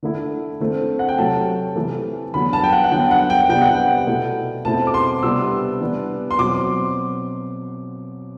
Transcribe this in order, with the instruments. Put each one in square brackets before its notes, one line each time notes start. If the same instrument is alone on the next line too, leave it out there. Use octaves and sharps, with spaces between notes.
[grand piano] D3 A3 E4
D3 A3 C4
F#5
G5
C3 F#3 A3 A5
C3 E3 A3
D3 F#3 B3 B5
A5
G5
F#5
F#5
D3 F#3 B3 D4 G5
F#5
G5
C3 G3 B3 D4 G5
F#5
G5
B2 A3 E4
B2 A3 C4 E4 A5
D6
C6
C3 G3 B3 D4 E6
E3 G3 B3 D4
C6
B2 F#3 C4 D6